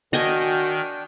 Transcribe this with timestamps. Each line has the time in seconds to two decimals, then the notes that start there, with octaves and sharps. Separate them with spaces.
0.13 D#3 D4 F#4 D#5 G5 G#5